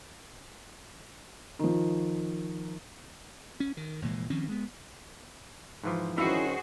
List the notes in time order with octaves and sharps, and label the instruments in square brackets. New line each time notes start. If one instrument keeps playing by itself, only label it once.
[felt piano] D#3 F3
[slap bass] C#4
D#3
F1 A#2 E3 G#3
D#3 F3 C4 C#4
G#3 B3
[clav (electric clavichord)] G#2 E3 F3
[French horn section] G2 D#3 C#4 [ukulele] E4 [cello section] F#4 G#4 C5